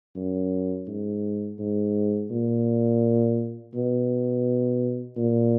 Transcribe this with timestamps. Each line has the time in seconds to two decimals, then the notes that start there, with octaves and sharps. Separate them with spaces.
0.16 F#2
0.88 G#2
1.59 G#2
2.31 A#2
3.74 B2
5.17 A#2